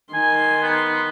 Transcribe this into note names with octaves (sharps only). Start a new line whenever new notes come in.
D#3 G#5 C6
B3